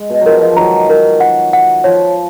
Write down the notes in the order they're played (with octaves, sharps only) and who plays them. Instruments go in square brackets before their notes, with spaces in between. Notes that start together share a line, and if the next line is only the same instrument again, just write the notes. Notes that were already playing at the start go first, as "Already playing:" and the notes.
Already playing: [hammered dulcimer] G#3
B2
[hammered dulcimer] F3 F#3 G#3 [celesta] A#4
[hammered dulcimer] F3 G#3
F3
[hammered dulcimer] D#3 F#3 [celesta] A#5
[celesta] A#4
F#5
F#5
[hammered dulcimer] F3 [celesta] C#5